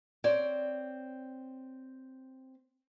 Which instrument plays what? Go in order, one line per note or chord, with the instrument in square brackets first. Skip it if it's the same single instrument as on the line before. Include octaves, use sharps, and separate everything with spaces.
[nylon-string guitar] C4 C#5 D5